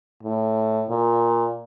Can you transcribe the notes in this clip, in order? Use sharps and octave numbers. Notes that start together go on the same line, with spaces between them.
A2
A#2